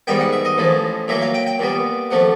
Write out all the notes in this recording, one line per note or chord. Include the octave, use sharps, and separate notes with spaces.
G#2 D#3 G3 B3 G5
F#5
E5
D#5
A1 A2 F3
A#2 F#3 A#3 E5
F5
G5
G5
A#2 G3 B3
C3 F3 A3 F#5